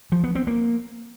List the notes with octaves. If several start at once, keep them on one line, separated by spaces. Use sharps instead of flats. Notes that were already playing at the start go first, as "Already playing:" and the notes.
F3
B3
C4
A#3